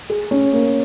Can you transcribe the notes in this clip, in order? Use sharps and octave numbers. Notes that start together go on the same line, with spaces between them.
G#4
C#4
A#3